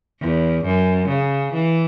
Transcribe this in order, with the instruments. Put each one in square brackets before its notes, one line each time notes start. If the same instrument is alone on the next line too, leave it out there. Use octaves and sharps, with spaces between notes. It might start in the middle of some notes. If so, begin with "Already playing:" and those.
[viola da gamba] E2
F#2
C#3
E3